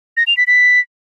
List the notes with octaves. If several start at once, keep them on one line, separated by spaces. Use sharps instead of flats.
A#6
F7
B6
B6